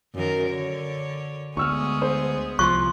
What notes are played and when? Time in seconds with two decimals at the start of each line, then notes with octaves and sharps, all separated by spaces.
0.14 F#2 D#3 A#4
0.49 D3 C#5
1.57 D2 G#3 B3 G#4 C#6 E6 F6
2.02 C5
2.59 C2 F3 C6 C#6 F#6